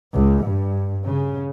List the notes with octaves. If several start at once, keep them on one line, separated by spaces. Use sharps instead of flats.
C#2
G2
C#3